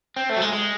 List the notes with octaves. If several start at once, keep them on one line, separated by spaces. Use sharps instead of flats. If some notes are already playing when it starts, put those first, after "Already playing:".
C4
A3
F#3
G#3
G#3